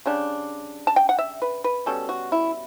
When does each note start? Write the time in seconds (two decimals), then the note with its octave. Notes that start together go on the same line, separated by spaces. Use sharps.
0.06 C#3 G3 D4
0.87 A5
0.96 G5
1.09 F#5
1.19 E5
1.42 B4
1.64 B4
1.86 B2 G3 C#4 A4
2.09 F#4
2.32 E4